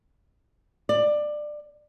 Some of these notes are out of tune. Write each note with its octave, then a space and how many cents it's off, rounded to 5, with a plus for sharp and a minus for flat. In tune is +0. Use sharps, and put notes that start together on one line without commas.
D5 +20